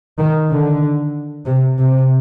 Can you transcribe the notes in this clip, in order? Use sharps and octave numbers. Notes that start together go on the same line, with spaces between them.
D#3
D3
C3
C3